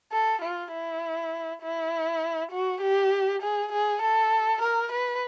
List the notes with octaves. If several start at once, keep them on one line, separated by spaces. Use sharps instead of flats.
A4
F4
E4
E4
F#4
G4
G#4
G#4
A4
A#4
B4